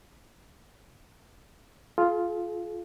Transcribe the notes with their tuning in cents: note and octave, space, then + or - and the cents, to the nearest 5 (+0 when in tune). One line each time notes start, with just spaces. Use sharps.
F4 +0 G#4 +45